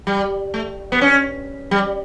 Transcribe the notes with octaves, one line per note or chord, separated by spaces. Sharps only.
G3
A3
B3
C#4
G3